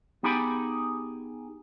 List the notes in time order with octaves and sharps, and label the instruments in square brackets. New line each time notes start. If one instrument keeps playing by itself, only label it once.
[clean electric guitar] B3 D#4 G4 G#4 G5 B5